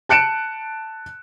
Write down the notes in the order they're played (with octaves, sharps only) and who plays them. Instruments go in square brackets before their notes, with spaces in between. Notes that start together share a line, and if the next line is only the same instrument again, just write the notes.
[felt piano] A5 F#6 C#7 D7 E7